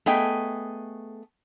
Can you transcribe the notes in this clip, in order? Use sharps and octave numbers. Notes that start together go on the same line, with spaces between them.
A3 B3 G#4 D#5 G5